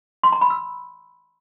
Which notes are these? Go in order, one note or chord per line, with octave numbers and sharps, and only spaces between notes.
C6
A#5
B5
E6